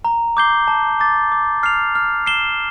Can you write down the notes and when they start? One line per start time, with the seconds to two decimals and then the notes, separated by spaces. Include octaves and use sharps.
0.05 A#5
0.37 D6 G6 C7 G7
0.68 A5
1.00 D6 A6
1.32 D6
1.63 F6 C7 F7
1.95 F6
2.26 C7 E7 G7